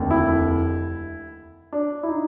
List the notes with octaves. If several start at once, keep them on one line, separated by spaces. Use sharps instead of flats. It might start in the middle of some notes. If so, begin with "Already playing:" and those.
Already playing: F1 D#2 D3
E4
D4
E4
D#4